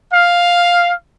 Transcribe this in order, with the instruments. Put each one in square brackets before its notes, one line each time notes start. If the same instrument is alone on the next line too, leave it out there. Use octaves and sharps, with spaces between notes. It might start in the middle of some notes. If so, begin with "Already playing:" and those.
[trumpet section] F5